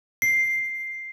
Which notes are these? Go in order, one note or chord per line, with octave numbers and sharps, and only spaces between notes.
C7